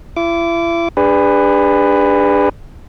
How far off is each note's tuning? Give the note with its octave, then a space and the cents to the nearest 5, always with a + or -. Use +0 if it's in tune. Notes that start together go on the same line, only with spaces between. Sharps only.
E4 +40 D6 -20
D4 +0 G#4 -40 B4 +10